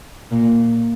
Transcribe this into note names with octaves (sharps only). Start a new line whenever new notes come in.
A#2